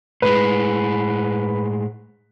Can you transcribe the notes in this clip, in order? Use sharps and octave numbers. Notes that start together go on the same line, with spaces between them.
A2 G#3 B4